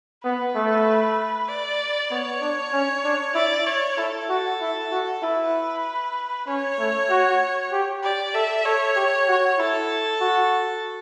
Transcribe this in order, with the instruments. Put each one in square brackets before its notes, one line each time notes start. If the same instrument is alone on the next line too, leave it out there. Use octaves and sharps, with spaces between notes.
[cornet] B3 [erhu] B4
[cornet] A3
[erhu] D5
[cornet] B3 [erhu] C#5
[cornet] D4
C#4
D4
[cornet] E4 [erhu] D5
[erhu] C#5
[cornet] E4 [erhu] A4
[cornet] F#4
E4
F#4
[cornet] E4 [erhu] B4
[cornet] C#4 [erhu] C#5
[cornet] A3
F#4
G4
[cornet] G4 [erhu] D5
[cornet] A4 [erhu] E5
[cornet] A4 [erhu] C#5
[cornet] G4
F#4
[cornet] E4 [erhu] A4
[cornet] F#4